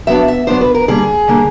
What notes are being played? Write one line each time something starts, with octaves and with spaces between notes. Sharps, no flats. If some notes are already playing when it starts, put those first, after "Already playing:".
F#3 B3 D4 E5
E5
F#3 B3 D4 C5
B4
A#4
D3 G3 A#3 D4 G#4
D3 G3 A#3 D4